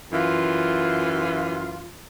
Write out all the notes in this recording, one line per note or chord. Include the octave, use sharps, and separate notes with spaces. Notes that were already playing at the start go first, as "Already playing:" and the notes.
F#2 E3 F4